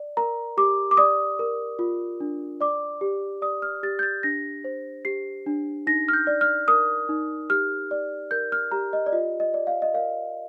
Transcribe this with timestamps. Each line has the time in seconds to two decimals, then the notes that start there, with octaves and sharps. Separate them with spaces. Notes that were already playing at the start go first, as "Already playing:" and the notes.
Already playing: D5
0.17 A#4 A#5
0.57 G4 D6
0.91 D6
0.97 D5 D#6
1.39 A#4
1.79 F4
2.20 D4
2.61 D5 D6
3.01 G4
3.42 D5 D#6
3.62 F6
3.83 G4 A6
3.99 G6
4.03 A6
4.23 D4 A#6
4.64 C5
5.05 G4 C7
5.46 D4
5.87 D#4 A#6
6.08 F6
6.13 G6
6.27 D5
6.41 F6
6.68 A#4 D#6
7.09 D#4
7.50 G4 F6
7.91 D5
8.31 A#4 G6
8.52 F6
8.71 G4 A#5
8.93 D#5
9.06 D5
9.12 F4 D#5
9.40 D#5
9.54 D5
9.67 F5
9.82 D#5
9.94 A#4 F5